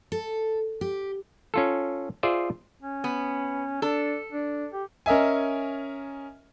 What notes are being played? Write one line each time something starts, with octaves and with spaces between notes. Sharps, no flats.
A4
G4
C#4 F4 A4
F4 G#4 C5 D5 E5
C#4
B3
D4 A4
D4
G4
C#4 A#4 D#5 E5 G#5